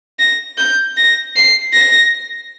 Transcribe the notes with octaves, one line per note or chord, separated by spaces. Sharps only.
A#6
G6
A#6
C7
A#6